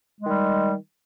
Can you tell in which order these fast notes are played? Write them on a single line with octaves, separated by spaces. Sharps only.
G#3 D#3 G3